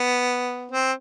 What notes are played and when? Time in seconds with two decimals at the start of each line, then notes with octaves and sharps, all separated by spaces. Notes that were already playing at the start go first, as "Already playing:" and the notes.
Already playing: B3
0.72 C4